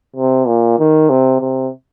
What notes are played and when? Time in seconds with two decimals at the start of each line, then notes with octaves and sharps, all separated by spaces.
0.16 C3
0.47 A#2
0.79 D#3
1.10 C3
1.41 C3